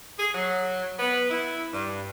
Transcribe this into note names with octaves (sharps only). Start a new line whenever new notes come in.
G#4
F#3
B3
E4
G2